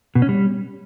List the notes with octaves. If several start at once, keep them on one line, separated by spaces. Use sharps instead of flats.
B2
C#4
G3